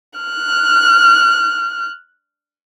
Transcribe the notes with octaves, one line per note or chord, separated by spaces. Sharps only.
F6 F#6